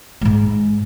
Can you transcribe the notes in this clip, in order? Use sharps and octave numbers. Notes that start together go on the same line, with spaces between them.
G#2 G#3